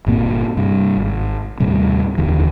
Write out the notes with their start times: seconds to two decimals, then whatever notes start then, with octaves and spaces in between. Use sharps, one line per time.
0.06 G1 A#2 A#3 C4
0.57 G2 C3
0.97 G#1
1.60 D#2 A2 C3 G3
2.18 F1 D#2 D3 E3